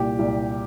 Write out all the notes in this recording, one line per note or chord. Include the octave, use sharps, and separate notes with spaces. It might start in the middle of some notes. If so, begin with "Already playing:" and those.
Already playing: C2 A#2 G4
C2 A#2